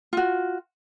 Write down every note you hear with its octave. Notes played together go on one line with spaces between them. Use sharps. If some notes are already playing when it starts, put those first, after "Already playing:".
F4 F#4